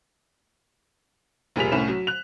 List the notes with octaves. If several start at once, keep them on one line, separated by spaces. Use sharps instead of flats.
F1 A#2 G3 G#4 B6 F7
C2 A2 C#4 E7
F#3
F#6 F7